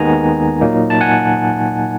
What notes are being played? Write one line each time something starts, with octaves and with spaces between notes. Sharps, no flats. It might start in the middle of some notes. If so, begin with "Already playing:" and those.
Already playing: D#2 D#3 G#3 B3 D#4 G#5 A#5
A#2 F#3 A#3 D#4
A5
F#5 G#5